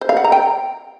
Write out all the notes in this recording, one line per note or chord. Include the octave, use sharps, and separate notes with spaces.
C5
F5
F#5
A#5
G5